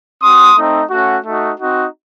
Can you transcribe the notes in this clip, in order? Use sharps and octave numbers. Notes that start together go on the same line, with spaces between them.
C4 F#4 C6 D#6
A3 C4 D#4
A3 C#4 F#4
A3 D#4 F#4
C4 D#4 F#4